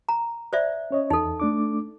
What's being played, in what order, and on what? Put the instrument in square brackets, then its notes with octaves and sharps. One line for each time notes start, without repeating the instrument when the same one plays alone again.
[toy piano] A#5
C5 D5 E5
[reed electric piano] C#4 C#5 D#5
[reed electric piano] E2 [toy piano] D#4 A4
[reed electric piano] A3 D4 D6